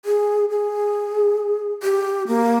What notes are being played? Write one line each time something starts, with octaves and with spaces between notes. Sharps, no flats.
G#4
G#4
G4
A#3